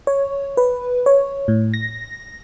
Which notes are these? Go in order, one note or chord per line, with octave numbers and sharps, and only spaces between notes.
C#5
B4
C#5
A2
A#6